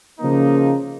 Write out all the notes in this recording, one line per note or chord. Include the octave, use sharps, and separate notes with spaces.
C#3 F3 A#3 D#4